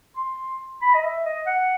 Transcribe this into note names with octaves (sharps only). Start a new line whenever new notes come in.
C6
B5
D#5
E5
D#5
F#5